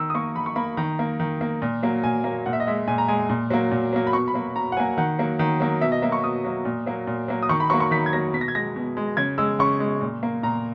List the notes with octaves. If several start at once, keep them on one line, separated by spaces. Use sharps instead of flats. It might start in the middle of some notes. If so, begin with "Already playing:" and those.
Already playing: D#3 E6
D#6
A#3 C#6
D#3 B5
C#6
A#3 B5
D#3 A#5
A#3
D#3
A#3
A#2
F#3 A#3
A#2 G#5
F#3 A#3
A#2 F#5
E5
D#5
G#3 E5
A#2 G#5
A#5
G#3 G#5
A#2
F#3 A#3
A#2
F#3 A#3
B5
B2 C#6
B5
F#3 A#3
B2 A#5
F#5
F#3 A#3 G#5
D#3 F#5
F#3 A#3
D#3
F#3 A#3
B2 E5
D#5
F#3 A#3 E5
C#6
B2 D#6
F#3 A#3
A#2
F#3 A#3
A#2
F#3 A#3
D#6
D#3 C#6
B5
F#3 A#3 C#6
C#6
D#3 B6
G#6
F#3 A#3 A#6
B2 B6
A#6
G#6
G#3 A#6
B2
G#3
C#3 G#6
G#3 E6
C#3 C#6
G#3
A#2
A#3
A#2 A#5